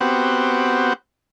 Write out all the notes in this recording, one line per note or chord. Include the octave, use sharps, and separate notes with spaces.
B3 C4 F#4 G4